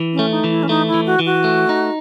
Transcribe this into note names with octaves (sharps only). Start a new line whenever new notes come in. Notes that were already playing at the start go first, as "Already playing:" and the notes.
Already playing: E3
C#4
A3
D#4
E3
E4
C#4
A3 D#4
E4
E3
F#4
E3
F#4
A3
D#4